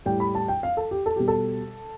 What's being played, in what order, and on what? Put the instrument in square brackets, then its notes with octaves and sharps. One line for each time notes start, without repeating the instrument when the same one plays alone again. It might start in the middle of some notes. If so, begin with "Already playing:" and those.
[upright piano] A2 G3 G5
B5
A5
G5
F5
A4
G4
A4
B2 G3 G4
A4